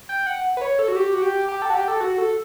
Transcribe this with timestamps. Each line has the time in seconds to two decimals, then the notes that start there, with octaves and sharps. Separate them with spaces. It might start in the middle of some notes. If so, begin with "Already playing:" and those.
0.09 G5
0.27 F#5
0.57 B4
0.62 C#5
0.79 A4
0.88 F#4
0.96 G4
1.14 F#4
1.22 G4
1.48 G4
1.62 A4
1.70 F#4
1.75 G4
1.88 A4
2.01 F#4
2.18 A4